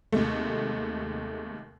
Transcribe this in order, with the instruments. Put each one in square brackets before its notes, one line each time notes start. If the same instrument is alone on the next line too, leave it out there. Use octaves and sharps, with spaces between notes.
[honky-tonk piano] D#2 C3 G#3 A3